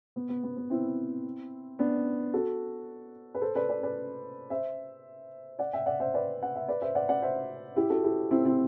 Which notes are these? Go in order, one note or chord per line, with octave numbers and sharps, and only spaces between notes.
B3
B3
B3
B3
C4 E4
B3 D4
F#4 A4
B4
A4 C5
B4 D5
B4 D5
B4 D5
C5 E5
D5 F#5
E5 G5
D5 F#5
C5 E5
B4 D5
F#5
E5
B4 D5
C5 E5
D5 F#5
D5 F#5
C5 E5
E4 G4
F#4 A4
E4 G4
C4 E4
C4 E4